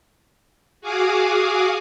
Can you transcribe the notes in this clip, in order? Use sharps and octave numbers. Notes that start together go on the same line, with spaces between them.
F#4 G#4 F5 G#5 D6 D#6